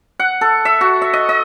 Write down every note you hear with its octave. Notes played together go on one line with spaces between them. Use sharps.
F#5
A4
E5
F#4
E5
D#5
D#5